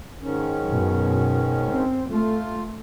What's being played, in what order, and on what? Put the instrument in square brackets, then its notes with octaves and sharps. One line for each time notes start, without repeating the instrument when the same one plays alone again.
[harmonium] G#2 D#3 C#4
[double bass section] F#2 B2
C4
[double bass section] A3 [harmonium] F4